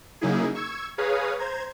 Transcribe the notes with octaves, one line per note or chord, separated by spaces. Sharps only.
C#3 F#3 A#3 D#4 E4 G#4
C#6 E6 G#6
G#4 B4 C#5 F5 A#5 D#6
C5 A#5 G#6